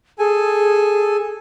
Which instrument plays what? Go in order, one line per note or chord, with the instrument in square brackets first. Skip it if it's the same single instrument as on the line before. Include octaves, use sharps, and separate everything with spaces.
[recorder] G#4 [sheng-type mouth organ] A4 G#5